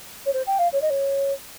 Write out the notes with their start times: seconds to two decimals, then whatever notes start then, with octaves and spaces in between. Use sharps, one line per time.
0.26 C#5
0.33 C5
0.47 G5
0.59 F5
0.73 C#5
0.82 D#5
0.90 C#5